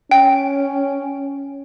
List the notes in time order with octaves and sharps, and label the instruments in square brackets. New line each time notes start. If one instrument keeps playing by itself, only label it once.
[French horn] C#4 [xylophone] G5